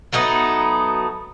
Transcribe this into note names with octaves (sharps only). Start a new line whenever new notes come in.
F#3 A3 B3 D#4